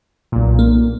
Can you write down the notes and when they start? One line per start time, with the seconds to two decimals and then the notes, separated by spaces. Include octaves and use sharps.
0.32 B1 A#2
0.59 A#3